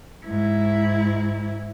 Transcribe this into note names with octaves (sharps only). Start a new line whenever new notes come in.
G#2 E4